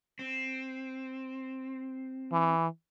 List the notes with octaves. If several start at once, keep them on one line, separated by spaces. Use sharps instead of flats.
C4
E3